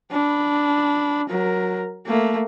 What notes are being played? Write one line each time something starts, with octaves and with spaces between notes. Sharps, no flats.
D4 B5
F#3 A#4
A3 A#3